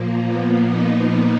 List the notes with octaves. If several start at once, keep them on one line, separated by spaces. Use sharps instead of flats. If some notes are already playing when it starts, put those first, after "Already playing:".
Already playing: A#2 F3 A#3
B3
D#4